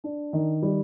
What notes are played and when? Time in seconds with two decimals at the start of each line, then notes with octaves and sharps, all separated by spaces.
0.04 D4
0.33 D#3
0.62 G3